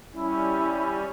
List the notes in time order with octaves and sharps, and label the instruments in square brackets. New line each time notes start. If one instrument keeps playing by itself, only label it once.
[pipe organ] G3 C#4 [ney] E4